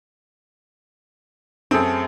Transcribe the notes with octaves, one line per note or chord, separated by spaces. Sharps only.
F#2 A3 C4 G#4 A4